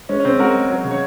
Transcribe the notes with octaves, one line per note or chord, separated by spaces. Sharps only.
G#3 C#4
C#4
C#3 C4
G#3 F#4 A#4
G#3
F#3
C#3
C#5